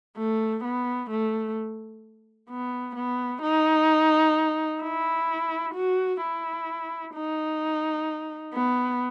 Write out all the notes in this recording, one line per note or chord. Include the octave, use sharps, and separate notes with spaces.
A3
B3
A3
B3
B3
D#4
E4
F#4
E4
D#4
B3